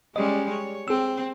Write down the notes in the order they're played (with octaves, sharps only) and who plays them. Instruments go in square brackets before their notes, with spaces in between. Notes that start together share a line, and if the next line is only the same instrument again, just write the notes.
[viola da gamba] G3 G#3 C#4 [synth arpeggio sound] D#5
[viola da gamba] C#5
[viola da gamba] C4 [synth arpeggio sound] G#4 E6